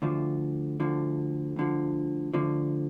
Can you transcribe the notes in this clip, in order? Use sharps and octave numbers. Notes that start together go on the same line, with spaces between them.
D2 D3 F3
D2 D3 F3
D2 D3 F3
D2 D3 F3